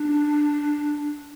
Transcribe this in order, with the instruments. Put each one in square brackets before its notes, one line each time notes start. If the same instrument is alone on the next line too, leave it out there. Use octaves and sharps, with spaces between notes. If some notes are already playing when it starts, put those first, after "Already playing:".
Already playing: [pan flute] D4